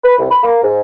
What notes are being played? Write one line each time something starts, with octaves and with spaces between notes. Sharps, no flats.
B4
C2
B5
A#3
G#2